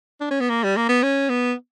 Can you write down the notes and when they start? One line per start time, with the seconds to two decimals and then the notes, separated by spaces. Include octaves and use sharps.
0.21 D4
0.31 C#4
0.41 B3
0.50 A#3
0.64 G3
0.77 A#3
0.89 B3
1.03 C#4
1.29 B3